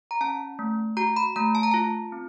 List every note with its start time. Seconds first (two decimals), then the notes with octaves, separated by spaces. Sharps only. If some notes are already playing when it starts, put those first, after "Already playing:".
0.11 A#5
0.21 C#4 A5
0.59 A3
0.97 F#4 A#5
1.16 B5
1.36 A3 A#5
1.55 A5
1.63 A#5
1.71 F4 A5
2.12 C4